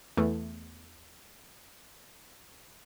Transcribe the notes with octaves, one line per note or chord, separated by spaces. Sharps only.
E2 A3